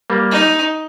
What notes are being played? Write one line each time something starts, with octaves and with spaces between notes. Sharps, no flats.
G3 A#3
D#4